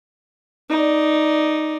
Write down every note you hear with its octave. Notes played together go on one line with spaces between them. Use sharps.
D#4 D5